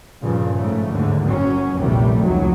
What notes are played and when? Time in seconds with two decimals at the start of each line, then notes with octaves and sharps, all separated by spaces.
0.23 G2 A#2 C#3 F3
0.57 G#2 C#3 A3
0.90 D#2 G#2 D3
1.26 F#1 F#2 F#3 C#4
1.78 A#1 E2 C3 D#3 G3 A3
2.24 F1 C#2 F#3 G#3